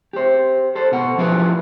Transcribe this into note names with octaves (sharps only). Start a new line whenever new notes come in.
G4 C5
A4 C5
B2 F#5
F3 C#4 E4 F4 G4 B4